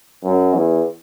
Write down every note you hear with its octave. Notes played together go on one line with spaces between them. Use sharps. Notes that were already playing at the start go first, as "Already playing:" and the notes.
F#2
E2